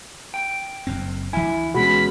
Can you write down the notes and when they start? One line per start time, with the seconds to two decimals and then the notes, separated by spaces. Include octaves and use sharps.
0.34 G5
0.87 F#1 F#2 C4
1.33 D2 E3 E4 G#5
1.75 B2 G#3 C#4 F#4 G#4 B5